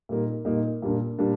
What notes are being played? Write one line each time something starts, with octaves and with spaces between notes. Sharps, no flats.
A#2 G3 A#3 D#4
A#2 G3 A#3 D#4
A#2 G3 A#3 D4
A#2 G3 A#3 D4